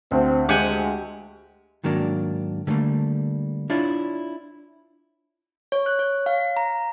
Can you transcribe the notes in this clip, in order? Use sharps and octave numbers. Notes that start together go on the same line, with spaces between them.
D2 C4
G#3 G4 F#5 G#5
G#2 D#3 F#3 A#3 D4
D3 F#3 G3 A3 A#3
D4 E4 F4 C#5 D5
C#5
F#6
C#5
F5
A#5